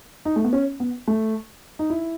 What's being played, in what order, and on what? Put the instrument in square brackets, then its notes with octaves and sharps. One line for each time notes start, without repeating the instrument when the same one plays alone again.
[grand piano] D#4
A3
B3
C#4
B3
A3
D#4
E4